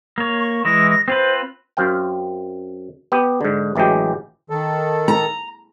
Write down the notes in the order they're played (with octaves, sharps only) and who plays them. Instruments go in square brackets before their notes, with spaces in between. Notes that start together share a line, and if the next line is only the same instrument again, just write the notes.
[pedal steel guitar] A#3 C#5
[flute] C#6
[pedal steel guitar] E3 G#3 E4 [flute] A#6
[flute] A#6
[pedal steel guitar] C4 F4 B4 [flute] C5
[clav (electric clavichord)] F#2 C4 F5 G5
B3 G4
G#2 D3
A1 E3 F#3 G#3 G4
[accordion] D#3 A4
[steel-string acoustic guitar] A#5